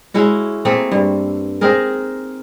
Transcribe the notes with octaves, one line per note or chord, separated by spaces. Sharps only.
G#3 C#4 E4 F#4
A3 A#3 C4 G#4
G2
C4 D#4 G#4 A#4